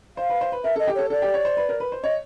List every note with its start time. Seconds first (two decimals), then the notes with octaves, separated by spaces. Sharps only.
0.17 C5 F5
0.30 B4
0.41 C5
0.52 B4
0.64 A#4 E5
0.76 A4 D#5
0.87 G4
0.95 A4 C#5
1.10 A4 D5
1.22 G4
1.34 C#5
1.45 C5
1.57 B4
1.69 A#4
1.80 B4
1.92 C5
2.04 C#5 D#5